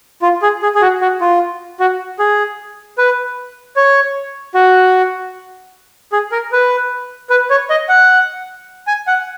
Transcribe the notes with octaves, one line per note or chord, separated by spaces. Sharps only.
F4
G#4
G#4
G#4
F#4
F#4
F4
F#4
G#4
B4
C#5
F#4
G#4
A#4
B4
B4
C#5
D#5
F#5
G#5
F#5